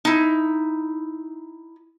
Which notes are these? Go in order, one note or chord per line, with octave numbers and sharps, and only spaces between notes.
D#4 E4